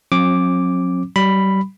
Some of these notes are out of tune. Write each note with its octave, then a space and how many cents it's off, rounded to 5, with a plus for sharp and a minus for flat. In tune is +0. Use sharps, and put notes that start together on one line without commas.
F#3 -45 C4 +45 D6 +0
G3 -35 B5 +0